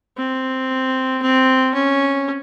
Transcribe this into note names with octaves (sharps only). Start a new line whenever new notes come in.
C4
C4
C#4